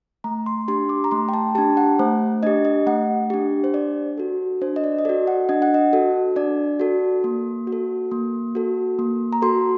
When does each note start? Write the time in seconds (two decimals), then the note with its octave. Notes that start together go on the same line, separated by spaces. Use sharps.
0.24 A3 A#5
0.46 C6
0.68 D4 G4 C6
0.89 D6
1.04 A#5
1.11 A3 C6
1.29 G5
1.34 A5
1.55 G4 A5
1.58 D4
1.77 F#5
1.99 A3 C5
2.43 D4 G4 D#5
2.65 D#5
2.86 A3 F#5
3.30 D4 G4
3.64 C5
3.74 D4 D5
4.18 F#4 A4
4.61 D4 C5
4.76 D#5
4.84 D5
4.99 D#5
5.05 F#4 A4 D5
5.27 F#5
5.49 D4 D#5
5.62 F#5
5.74 D#5
5.93 F#4 A4
6.36 D4 D5
6.80 F#4 A4
7.24 A#3
7.67 F#4
7.72 A4
8.11 A#3
8.55 F#4 A4
8.99 A#3
9.33 A#5
9.42 F#4 A4 C6